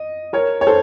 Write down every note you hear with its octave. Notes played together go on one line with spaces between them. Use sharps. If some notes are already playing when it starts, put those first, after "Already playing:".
Already playing: D#5
A#4 C#5
C#5
A4 C5